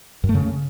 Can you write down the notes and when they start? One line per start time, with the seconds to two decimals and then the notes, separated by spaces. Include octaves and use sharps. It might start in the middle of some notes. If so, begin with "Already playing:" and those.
0.24 F#2
0.29 A3
0.34 C#3